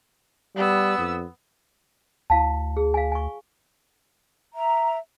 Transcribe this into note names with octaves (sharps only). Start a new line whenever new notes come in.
G3 B3 E6
F2
D2 E4 F5 A5
G#4
F5 G#5
G#5 C#6
E5 A#5